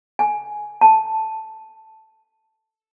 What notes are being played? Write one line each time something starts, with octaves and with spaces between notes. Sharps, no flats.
G#5
A5